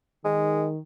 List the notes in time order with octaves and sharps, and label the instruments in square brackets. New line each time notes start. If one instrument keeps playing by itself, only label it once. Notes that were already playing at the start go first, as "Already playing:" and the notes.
[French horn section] D#3 [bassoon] G#3